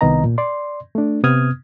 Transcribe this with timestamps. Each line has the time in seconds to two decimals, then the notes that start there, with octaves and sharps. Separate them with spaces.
0.01 C2 D#3 B3 D#5 A#5
0.24 A#2
0.38 D5 C6
0.95 A3 D4
1.24 C3 B3 D#6 F6 G#6